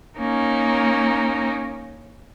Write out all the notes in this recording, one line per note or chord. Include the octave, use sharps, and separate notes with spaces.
A#3 C#4 D#4